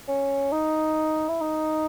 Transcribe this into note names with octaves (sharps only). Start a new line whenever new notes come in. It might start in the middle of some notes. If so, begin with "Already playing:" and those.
C#4
D#4
E4
D#4